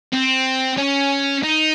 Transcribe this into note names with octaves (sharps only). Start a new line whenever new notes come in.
C4
C#4
D#4